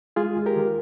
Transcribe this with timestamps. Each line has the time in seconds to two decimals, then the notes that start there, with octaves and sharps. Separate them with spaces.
0.16 G#3 F4 G#4
0.36 D#2
0.46 G4 A#4
0.56 D#3